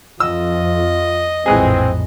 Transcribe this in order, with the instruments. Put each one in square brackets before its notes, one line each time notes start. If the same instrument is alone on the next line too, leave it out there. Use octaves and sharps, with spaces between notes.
[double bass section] F2 [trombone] F4 [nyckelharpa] D#5 [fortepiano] E6
[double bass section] A#1 F2 A2 [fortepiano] E3 G#3 G#4 [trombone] C4